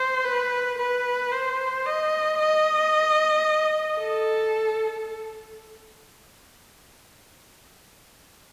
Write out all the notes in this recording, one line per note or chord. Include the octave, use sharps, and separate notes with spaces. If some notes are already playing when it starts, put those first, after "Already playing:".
Already playing: C5
B4
B4
C5
D#5
D#5
A4